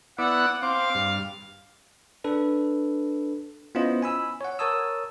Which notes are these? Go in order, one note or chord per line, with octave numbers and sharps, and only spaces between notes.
B3 E4 D5 F#5
C4 F5 D6
G2
D4 A4 B4
B3 C#4 E4 F4 C5 D#5
G#5 B5 E6
C#5 F#5
A#4 C#5 A5 D#6 E6